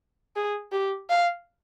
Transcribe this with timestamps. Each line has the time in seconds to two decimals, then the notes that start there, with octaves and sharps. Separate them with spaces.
0.36 G#4
0.72 G4
1.10 F5